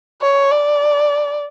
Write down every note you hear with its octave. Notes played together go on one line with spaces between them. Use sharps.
C#5
D5